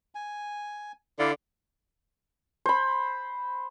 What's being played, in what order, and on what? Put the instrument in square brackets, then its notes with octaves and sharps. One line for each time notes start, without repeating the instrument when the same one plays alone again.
[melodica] G#5
[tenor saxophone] D3 [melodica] E4 D5 F5
[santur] C5 B5